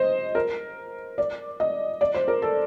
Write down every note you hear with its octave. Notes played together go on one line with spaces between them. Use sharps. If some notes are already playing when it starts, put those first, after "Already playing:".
Already playing: C5 D#5
A#4
D5
D#5
D5
C5
A#4
A4